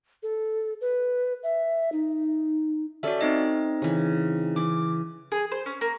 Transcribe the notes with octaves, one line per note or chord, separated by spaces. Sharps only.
A4
B4
E5
D#4
C#4 F#4 A4 D5 E5
C4 D#4 D#5
C#3 E3
E3 D6
G#4
C5
C#4
A#3